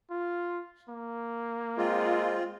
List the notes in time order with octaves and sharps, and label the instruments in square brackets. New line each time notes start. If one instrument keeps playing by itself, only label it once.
[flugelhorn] F4
A#3
[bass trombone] G#3 [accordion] C4 F4